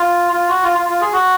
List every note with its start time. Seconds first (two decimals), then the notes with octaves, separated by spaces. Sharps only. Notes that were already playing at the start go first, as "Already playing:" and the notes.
Already playing: F4
0.33 F4
0.49 F#4
0.63 F4
0.79 F4
0.90 F4
1.01 G#4
1.12 F#4